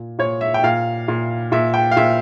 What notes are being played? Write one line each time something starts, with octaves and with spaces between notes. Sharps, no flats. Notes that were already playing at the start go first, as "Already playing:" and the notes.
Already playing: A#2
A#2 C#5
E5
G5
A#2 F5
A#2
A#2 E5
G5
F5
A#2 E5